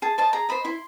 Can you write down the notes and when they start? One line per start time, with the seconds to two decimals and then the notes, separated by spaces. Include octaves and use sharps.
0.02 G#4 A5
0.18 C5 D#5 A5
0.33 G#4 A#5
0.49 C5 D#5 B5
0.65 E4 C6